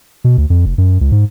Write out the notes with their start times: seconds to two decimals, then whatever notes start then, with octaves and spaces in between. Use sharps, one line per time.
0.24 B2
0.38 D2
0.50 F2
0.66 F1
0.78 F#2
1.01 C#2
1.12 G#2